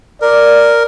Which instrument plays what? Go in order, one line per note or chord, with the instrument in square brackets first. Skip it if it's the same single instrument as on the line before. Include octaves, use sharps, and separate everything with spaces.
[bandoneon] A#4 [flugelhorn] D5